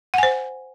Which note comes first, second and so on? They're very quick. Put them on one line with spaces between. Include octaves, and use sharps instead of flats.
F#5 G#5 C5